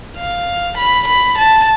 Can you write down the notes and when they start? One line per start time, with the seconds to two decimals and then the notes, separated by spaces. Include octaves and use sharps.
0.18 F5
0.77 B5
1.08 B5
1.38 A5